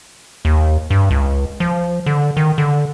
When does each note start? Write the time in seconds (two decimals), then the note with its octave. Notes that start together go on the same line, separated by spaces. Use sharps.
0.45 D#2
0.90 G2
1.11 C#2
1.60 F3
2.06 D3
2.37 D#3
2.58 D3